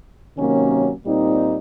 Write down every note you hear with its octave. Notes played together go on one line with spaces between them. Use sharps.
C3 D#3 F#3 A#3 C#4
A#2 G3 C4 D#4